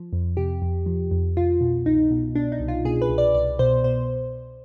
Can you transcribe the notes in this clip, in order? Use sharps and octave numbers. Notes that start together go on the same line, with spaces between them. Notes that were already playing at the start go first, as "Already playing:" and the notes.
Already playing: F3
F2
C3 G4
F2
F3
F2
C2 F4
B2
C2 D#4
B2
B2 D4
D#4
C2
F4
B2 G#4
B4
C2
D5
C2 D5
B2 C5
B2 C5